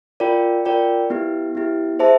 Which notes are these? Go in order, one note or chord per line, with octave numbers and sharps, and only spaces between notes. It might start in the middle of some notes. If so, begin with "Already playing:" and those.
F4 A#4 D5 G5
F4 A#4 D5 G5
B3 E4 G4
B3 E4 G4
G#4 C5 E5 A5